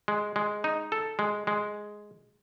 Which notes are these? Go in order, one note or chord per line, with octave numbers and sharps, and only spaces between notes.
G#3
G#3
D#4
A4
G#3
G#3